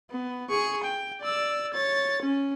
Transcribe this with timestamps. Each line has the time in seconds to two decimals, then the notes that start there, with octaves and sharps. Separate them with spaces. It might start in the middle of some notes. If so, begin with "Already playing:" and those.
0.11 B3
0.50 G#4 C#6
0.83 G5
1.21 D5 E6
1.74 C#5 A6
2.22 C#4